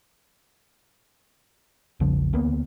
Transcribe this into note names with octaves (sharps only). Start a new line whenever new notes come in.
A#1 E2 C#3 F3
D2 A#3 B3